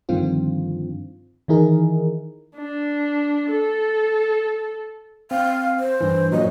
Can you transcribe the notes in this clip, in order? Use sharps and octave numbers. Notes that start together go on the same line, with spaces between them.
G2 D3 D#3 F3 C4 F4
D#3 E3 D#4 E4 G#4 A#4
D4
A4
C4 F5
C5
G2 E3
F#2 A#2 F#3 D#5